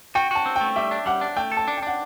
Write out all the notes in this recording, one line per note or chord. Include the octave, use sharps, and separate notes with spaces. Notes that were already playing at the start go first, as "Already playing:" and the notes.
F#4 G5
F#4 A5
C4
A3 G5
G3 E5
D4
G3 F#5
D4
A3 G5
A4
A5
D4
G5
D4 F#5